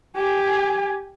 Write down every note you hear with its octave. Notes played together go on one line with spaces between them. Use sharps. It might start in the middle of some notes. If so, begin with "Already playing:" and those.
G4 G#5